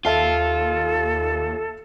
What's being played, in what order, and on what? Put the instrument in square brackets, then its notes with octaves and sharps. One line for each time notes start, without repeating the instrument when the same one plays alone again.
[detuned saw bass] D#2 [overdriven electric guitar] F4 [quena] A4 [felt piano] E5 F5 A5